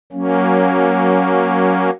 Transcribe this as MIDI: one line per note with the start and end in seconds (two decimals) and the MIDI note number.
0.13 1.90 54
0.13 1.90 58
0.13 1.90 61